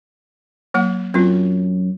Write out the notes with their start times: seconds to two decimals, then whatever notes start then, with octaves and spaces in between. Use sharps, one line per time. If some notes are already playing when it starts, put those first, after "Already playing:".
0.74 F#3 A#3 F#5
1.14 F#2 C4 F4